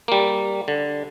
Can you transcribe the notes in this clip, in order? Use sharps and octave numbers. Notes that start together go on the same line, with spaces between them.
G3 A#3
D3